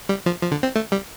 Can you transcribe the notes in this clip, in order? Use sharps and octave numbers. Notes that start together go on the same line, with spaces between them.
G3
F3
F3
D3
C4
A3
G3